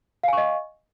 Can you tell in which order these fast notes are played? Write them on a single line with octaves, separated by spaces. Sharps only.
F5 G#5 C#6 D#5